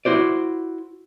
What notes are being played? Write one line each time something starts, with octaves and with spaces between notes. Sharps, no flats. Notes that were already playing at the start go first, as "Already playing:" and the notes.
E4 F#4 C5 D5